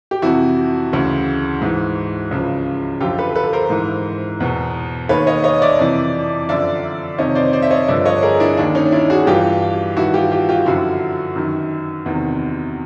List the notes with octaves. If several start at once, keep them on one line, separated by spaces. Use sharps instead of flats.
G4
F2 C3 E3 E4 F#4
D2 C#3 E3
G#2 E3
C#2 C#3 F3
F#2 D3 F3 F4 G4
A4 B4
A4 B4
A#4 C5
G#2 E3
E2 B2
D#2 D#3 B4 C#5
C#5 D#5
C#5 D#5
D5 E5
F2 C3 E3
F#2 D3 F3 D5 E5
F2 C3 D#3 C#5 D#5
C5 D5
C5 D5
E5
C#5 D#5
G2 D3 F3 D5 E5
C#5 D#5
G#4 A#4
D4 E4
D#2 D#3 D4
C#4 D#4
D4 E4
F#4 G#4
G2 E3 F4 G4
G2 D#3 E4 F#4
F4 G4
F4 G4
F4 G4
F#2 D3 F3 E4 F#4
F#2 D#3
E2 C3 D#3